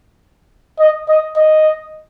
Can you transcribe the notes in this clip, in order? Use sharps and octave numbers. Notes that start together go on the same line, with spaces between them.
D#5
D#5
D#5